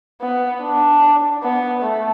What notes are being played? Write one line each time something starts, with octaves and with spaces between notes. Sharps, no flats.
B3
D4
B3
A3